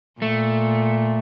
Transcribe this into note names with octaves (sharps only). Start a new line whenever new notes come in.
A#2 A3